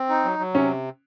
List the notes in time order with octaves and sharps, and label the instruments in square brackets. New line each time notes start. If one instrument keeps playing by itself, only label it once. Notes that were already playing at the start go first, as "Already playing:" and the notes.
Already playing: [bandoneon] C4
D#4
F#3
F#3
[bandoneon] C3 [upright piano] C#4